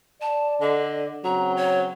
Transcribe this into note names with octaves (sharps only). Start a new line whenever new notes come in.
D5 A5
D3 D#5
C#3 F#3 C4 A#5
C#5